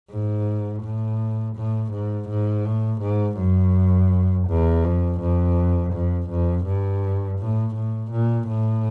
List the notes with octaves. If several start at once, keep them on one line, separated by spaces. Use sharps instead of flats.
G#2
A2
A2
G#2
G#2
A2
G#2
F#2
E2
F2
F2
F2
F2
G2
A2
A2
A#2
A2